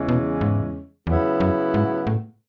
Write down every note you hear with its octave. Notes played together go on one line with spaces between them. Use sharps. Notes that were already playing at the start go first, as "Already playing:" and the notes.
Already playing: E2 C#3 E3 G#3 C#4
B2
G#2
E2 C#3 F#3 B3 E4
F#2
G#2
A2